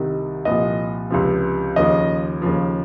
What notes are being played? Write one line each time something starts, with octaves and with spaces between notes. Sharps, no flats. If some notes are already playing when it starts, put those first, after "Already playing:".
Already playing: C2 C3 D#3
C2 A#2 F3 D#5
C#2 C3 F3
D#2 C#3 F3 D#5
D#2 C#3 F3